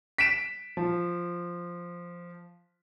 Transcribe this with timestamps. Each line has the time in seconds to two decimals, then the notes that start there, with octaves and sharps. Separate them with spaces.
0.18 B6 D7 E7
0.77 F3